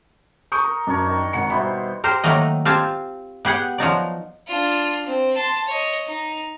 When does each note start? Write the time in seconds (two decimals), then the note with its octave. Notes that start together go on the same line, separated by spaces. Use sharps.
0.52 C#6 D#6 G6
0.63 A#4
0.87 F#2 D4 A#4 C#5
1.06 D#3
1.33 G#1 F#5 C#7
1.50 B2 G3 C5 E5 F#5 B5
2.04 G4 A#4 C5
2.24 A2 D#3 F#3 A3 A#3 D#5
2.65 C4 F4 G4 G#5 A5
3.45 B3 G4 G#4 F#5 G5
3.78 F3 F#3 D#4 D5
4.47 D4 F4
5.06 C4
5.36 A5 C6
5.67 C#5 D#5
6.06 D#4